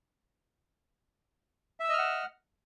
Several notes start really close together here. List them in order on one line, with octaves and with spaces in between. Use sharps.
E5 E6 D#5 F6 F#5